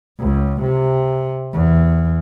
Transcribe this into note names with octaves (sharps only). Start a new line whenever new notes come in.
C#2
C3
E2